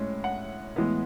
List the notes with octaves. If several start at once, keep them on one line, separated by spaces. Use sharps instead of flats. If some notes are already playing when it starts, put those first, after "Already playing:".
Already playing: A2 G#3 C#4
F#5
A2 E3 G#3 B3